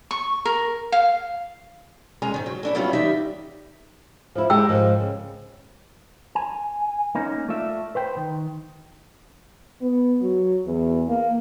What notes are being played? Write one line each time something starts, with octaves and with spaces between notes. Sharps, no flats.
C#6
A#4
F5
D#3 G#3 C#4 G#5 A#5
G#2 D#3
F#3
A3 D4 E4
F#3 G3 A3 B3 C#4 F4
E3 G3 D#4 E5
F3 E4
G#3 G4 G5 E6
G#2 D#3 F3
C#3
G#5
A#3 C#4 D#4
A3 F4 D5 E5
B4 C5 G5
D#3
B3
F#3
E2
A#3